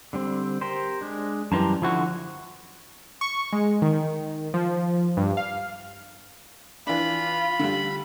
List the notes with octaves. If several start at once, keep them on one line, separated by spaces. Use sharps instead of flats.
D3 G3 C4
G4 A#4 C5
G#3 D4
F#2 E3 G3 A5 A#5 C6
D3 F3 E4 F#4
C#6
G#3
D#3
F3
G2
F5
E3 D4 F4 B5
D3 G3